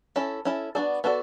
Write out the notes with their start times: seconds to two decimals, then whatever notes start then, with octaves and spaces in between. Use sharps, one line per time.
0.16 C#4 E4 A4
0.45 C#4 E4 A4
0.75 B3 D4 F#4 A4 D5
1.04 B3 D4 F#4 A4 D5